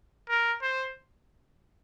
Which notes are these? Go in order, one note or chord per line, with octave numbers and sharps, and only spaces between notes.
A#4
C5